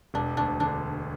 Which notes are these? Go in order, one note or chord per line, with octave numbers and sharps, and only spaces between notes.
E1 D4
D2 D4
D3 D4